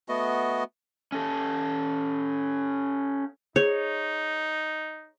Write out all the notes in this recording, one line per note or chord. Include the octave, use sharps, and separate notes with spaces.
A3 B3 F#4 D#5
C#4 A4
D#4 G#4 C#5